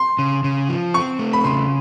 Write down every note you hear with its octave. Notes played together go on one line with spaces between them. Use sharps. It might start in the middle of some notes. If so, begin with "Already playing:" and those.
Already playing: C6
C#3
C#3
F3
C4 C#6
A3
B5
C#3 C6